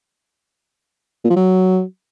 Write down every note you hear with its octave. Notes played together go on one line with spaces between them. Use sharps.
A#2
F3
F#3